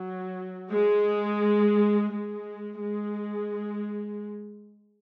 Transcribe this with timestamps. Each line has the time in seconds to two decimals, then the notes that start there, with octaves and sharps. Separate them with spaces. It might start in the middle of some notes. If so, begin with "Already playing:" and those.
Already playing: F#3
0.70 G#3
2.10 G#3
2.80 G#3